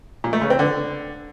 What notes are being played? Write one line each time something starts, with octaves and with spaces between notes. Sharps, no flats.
A#2
A3
C#3
C4
D3